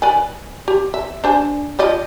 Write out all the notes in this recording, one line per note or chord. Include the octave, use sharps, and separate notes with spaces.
B4 D5 G#5
G4
E5
D4 C5 G#5
F3 D5 D#5